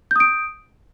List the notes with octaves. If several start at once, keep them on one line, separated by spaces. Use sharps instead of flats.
D#6 G6 D7